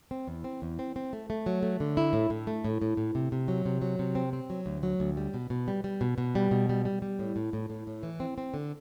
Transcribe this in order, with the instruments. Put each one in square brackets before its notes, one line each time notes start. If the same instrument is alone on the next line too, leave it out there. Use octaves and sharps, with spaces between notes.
[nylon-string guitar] C4
E2
C4
E2
C4
C4
A3
A3
F#3
A3
D3
E4
A2
A2
A3
A2
A2
A2
C3
C3
F#3
C3
F#3
C3
C4
C4
F#3
D2
F#3
D2
G3
B2
B2
G3
G3
B2
B2
G3
B2
G3
G3
G3
A2
A2
A2
A2
A2
E3
C4
C4
D3